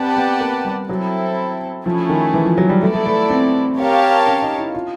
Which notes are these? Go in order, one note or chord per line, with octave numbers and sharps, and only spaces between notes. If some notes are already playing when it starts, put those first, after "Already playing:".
Already playing: C4 G4 B4 D5 F#5 A5
B3
A#3
G3
F#3 C4 E4 A4
F3 A3 C#4 E4 G#4
D#3
E3
F3
F#3
G3
A3 B3 E4 A4 D5
A3
A3
C4
G4 A#4 C#5 F5 A5
C#4
D#4
E4
F4